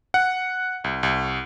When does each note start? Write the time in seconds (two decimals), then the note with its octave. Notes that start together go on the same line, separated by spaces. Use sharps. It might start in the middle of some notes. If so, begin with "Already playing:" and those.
0.14 F#5
0.84 C2
1.03 C2